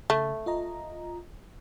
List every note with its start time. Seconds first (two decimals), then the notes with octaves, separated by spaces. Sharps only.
0.10 C#3 A3
0.46 F4 D#5 A#5